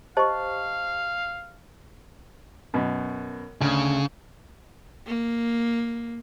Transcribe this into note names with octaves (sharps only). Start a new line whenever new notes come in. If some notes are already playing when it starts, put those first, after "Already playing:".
G4 C5 D#5 F5 A5 C#6
F#2 B2
D2 C#3
A#3